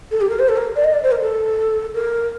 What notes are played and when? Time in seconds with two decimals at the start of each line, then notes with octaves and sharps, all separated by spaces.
0.11 A4
0.21 G4
0.30 A#4
0.39 C5
0.49 A4
0.57 A#4
0.76 D5
0.84 D#5
0.93 D5
1.03 C5
1.12 A#4
1.21 A4
1.95 A#4